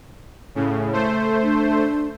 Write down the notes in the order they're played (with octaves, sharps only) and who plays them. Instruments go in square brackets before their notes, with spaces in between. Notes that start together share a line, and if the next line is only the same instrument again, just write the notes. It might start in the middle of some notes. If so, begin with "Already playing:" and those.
[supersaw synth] A2 C#3
A3 C5
[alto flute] D4